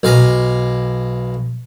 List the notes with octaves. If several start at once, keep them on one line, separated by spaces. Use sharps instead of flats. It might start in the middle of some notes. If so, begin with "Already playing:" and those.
B1 F5 G#5 A#5